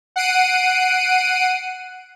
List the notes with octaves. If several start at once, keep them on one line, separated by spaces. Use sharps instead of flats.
F#5 C7 D7 D#7